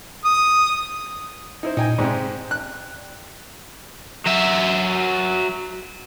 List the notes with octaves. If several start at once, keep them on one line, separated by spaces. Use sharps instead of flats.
D#6
D#4 E4 C5
A#2 D#4 G5 G#5
G#2 C3 D5 G5
F#6
F#3 E5